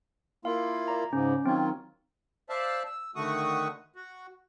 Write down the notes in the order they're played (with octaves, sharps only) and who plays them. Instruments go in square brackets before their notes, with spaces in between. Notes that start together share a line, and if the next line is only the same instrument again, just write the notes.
[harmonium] A#3 E4 F4 [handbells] F5
[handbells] D5 A#5
[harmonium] G#2 C#3 [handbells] C#4 D6
[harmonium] D#3 F#3 F4 [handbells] C4 D#4
[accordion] C5 D5 E5 F5 A5
E6
D3 D#3 A3 F#4 C#6 D#6
F#4